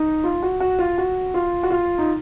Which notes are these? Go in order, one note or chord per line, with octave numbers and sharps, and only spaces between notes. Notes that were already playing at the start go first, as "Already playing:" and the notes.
Already playing: D#4
F4
F#4
F#4
F4
F#4
F4
F#4
F4
D#4